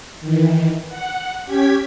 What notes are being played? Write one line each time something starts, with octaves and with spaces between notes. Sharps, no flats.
D#3 E3
F#5
C#4 G4 G#6 B6